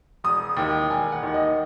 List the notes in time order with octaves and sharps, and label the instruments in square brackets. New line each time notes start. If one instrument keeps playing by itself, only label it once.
[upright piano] E1 D#6
D#2 D#3
E1 G#5
F#5
D#2 D#3
D#5